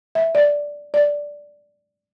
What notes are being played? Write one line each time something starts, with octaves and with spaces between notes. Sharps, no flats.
E5
D5
D5